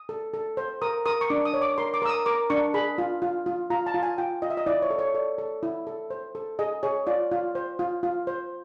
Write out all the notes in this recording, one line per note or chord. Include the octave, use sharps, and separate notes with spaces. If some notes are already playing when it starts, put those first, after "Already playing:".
Already playing: D#6
A4
A4
C5
A#4 D#6
A#4 D#6
C#6
D4 D6
D#6
C#5
D6
A#4 C6
D6
A#4 E6
D#6
A#4 D6
D4 C#6
G#4 B5
F4
F4
F4
F4 A#5
A5
F4
G#5
F4 G5
F4 D#5
E5
D#5
E4 D5
C#5
A4
C#5
A4 D5
A4
E4
A4
C5
A4
G#4 D#5
G#4 C#5
F4 D5
F4
C5
F4
F4
C5